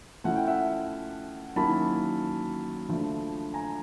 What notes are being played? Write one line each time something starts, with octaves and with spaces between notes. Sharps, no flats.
F3 A3 C#4 E4 F#5
G5
E5 F#5
D#3 F#3 A#3 C#4 E4 A5 B5
D3 F3 A3
G#5 A#5